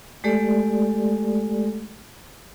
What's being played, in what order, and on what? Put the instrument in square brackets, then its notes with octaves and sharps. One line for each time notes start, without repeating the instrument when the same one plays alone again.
[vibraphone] G#3 A3 G4 A4 D5